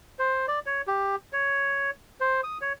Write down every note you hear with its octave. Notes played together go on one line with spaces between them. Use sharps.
C5
D5
C#5
G4
C#5
C5
D#6
C#5